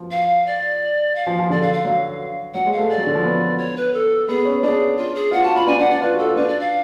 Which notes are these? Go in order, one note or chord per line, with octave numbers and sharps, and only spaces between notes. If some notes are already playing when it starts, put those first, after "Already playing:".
Already playing: F3
F5
D5
F5
F3
F3
D3 D5
D3 F5
F5
F#3
F#3 F#5
G#3
F5
A3
G#3 D5
F#3
D3
F3
B3
C#5
B4
A4
B3 G#4
C#4
D4 G#4
F4
G#4
F4 F#5
F#4 A5
F4 B5
D4 G#5
D4 F#5
D4 D5
F4 B4
F#4
A4
F4
D4 B4
D5
F5